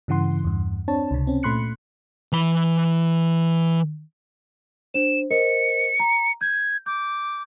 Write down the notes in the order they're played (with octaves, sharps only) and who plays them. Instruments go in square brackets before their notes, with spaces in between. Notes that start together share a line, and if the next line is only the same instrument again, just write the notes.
[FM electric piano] G2 C#3 E3 F#5 C6
E2 G2
C4 D4 C#5 A5
C#2 C3
C4 C#4
A#2 A3 B5 C6 F#6 C#7
[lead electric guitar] E3 B5
[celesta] D4 C5 [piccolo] E7
[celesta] A#4 C5 D#5 [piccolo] C#7
[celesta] A#5
[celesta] G6 [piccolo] G#6
[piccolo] D6 [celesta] G6